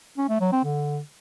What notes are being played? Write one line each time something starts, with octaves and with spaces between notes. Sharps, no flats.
C#4
A3
F#3
C4
D3